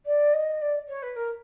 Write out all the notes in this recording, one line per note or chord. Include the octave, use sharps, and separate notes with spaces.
D5
D#5
D5
C#5
B4
A#4